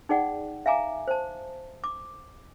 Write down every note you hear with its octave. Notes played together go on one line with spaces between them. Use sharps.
D#4 G#4 D5 F#5 G5
E5 F5 G#5 A#5 D6
C5 A5
D6